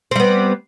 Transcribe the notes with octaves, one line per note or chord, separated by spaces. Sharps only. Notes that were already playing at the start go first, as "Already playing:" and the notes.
G3 B3 C4